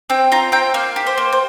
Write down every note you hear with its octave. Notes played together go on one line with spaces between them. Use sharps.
C4 G5
F4 A#5
C4 G5
A#3 F5
G4
C5
A#3
C5